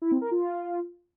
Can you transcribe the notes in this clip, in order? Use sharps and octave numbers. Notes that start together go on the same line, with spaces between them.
E4
C4
A#4
F4